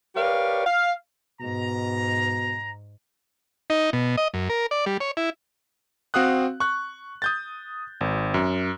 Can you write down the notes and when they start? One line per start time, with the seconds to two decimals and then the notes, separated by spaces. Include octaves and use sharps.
0.16 G4 A#4 B4 C#5 D5 F5
0.66 F5
1.41 G#2 B2 A#5
3.70 D#4
3.93 B2
4.17 D#5
4.34 F#2
4.49 A#4
4.71 D5
4.86 G3
5.00 C#5
5.17 E4
6.14 C4 F#4 F5 D#6 F#6
6.60 C#6 F#6
7.22 D#6 G6 A6
8.01 G#1
8.34 F#2